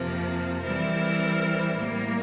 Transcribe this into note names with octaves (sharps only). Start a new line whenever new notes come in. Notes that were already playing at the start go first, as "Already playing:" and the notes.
Already playing: F2 C3 F3 A#3
E3 G3 C4 E4 A#4
A2 G3 A#3